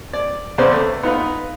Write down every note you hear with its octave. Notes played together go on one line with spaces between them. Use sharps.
D5
E2 C#3 B4 C5 D5
A3
B3 D#4 F4 B4